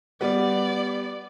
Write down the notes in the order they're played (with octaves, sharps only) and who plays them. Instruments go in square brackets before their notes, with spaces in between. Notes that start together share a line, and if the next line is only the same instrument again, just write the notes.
[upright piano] G3 B3 [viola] D5